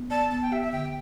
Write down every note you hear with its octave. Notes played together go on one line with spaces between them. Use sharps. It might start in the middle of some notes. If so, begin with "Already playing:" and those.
Already playing: B3
D5 A5
B3 A5
G5
G4 E5
E5
D3 G5